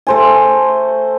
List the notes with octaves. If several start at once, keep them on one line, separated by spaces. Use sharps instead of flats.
A3 C5 G#5